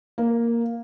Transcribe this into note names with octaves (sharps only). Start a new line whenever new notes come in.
A#3